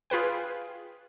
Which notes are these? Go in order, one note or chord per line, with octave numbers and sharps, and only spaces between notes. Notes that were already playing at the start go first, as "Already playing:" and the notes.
F4 G#4 B4 G5